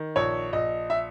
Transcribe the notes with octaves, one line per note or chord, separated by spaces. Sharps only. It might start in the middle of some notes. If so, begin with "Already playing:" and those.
Already playing: D#3
A#1 C#5
A#1 D#5
E5